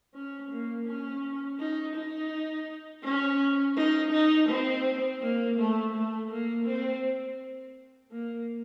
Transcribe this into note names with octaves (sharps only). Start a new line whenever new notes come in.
C#4
A#3
C#4
D#4
D#4
C#4
D#4
D#4
C4
A#3
A3
A3
A#3
C4
A#3